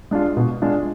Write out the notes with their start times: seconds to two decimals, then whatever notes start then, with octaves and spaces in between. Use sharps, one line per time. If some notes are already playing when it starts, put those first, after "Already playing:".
0.11 G#3 D4 F4
0.37 B2
0.62 G#3 D4 F4